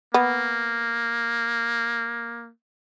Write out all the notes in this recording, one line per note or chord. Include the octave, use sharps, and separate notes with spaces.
A#3 B3